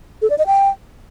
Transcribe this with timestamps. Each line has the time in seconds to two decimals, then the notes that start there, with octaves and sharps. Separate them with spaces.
0.22 A4
0.30 D5
0.38 D#5
0.47 G5